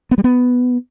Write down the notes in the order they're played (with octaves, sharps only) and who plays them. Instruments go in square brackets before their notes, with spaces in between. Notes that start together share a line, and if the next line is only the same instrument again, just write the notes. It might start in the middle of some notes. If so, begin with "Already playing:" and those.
[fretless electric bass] B3
G3
B3